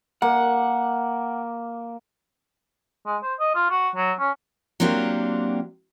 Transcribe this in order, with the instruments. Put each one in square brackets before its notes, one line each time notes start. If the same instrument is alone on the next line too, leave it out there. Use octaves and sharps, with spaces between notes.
[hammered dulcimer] A#3 [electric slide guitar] F#5
[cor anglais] G#3
C5
D#5
F4
F#4
F#3
C#4
[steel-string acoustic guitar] F#3 A#3 C4 D4 F4 G4